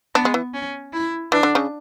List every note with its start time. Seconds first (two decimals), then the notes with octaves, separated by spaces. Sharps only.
0.15 B3 D4
0.25 G#3
0.34 E3
0.54 C#4
0.93 E4
1.32 E3 D4
1.43 D3
1.55 C#3